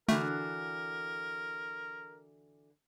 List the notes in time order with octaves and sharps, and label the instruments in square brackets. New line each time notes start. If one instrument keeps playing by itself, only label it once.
[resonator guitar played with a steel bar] D3 E3 F#4 [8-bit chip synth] A3 [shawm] A#4